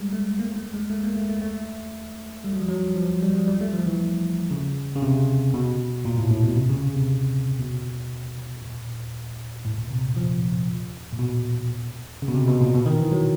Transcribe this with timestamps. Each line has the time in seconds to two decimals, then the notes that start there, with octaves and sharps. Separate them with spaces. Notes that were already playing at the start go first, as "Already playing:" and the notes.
Already playing: G3 G#3
0.13 A3
0.39 A#3
0.56 A3
0.74 G#3
0.90 A3
1.03 A#3
1.16 A3
1.29 A3
1.42 A3
2.44 G3
2.53 F#3
2.61 F3
2.68 F#3
2.96 F3
3.22 G3
3.35 F#3
3.48 G3
3.61 A3
3.73 F3
3.86 E3
4.51 C#3
4.96 C#3
5.02 C3
5.54 B2
6.05 A#2
6.18 A2
6.31 A2
6.43 B2
6.56 C3
6.69 C#3
6.82 C#3
6.95 C3
7.59 B2
8.62 A#2
9.65 A2
9.78 A#2
9.91 C3
10.16 F3
11.13 A#2
11.19 B2
12.22 C#3
12.28 B2
12.34 C3
12.48 B2
12.61 A#2
12.74 B2
12.86 D#3
12.99 E3
13.12 F#3